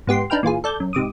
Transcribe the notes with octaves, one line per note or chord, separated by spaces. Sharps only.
G#2 B3 G4 C6
D4 D#4 B4 G5 F6
A#2 E3 F4 G#4
A4 D5 G6
F#2
G#2 C3 D6 D#6